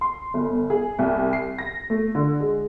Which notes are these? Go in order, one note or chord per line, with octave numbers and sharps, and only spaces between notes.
C6
G1
G#4
C2
C7
A#6
A3
D3
G#3